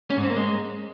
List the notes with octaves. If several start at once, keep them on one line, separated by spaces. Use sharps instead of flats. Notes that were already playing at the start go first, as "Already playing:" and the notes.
C#4
G#2
C4
A#3
G#3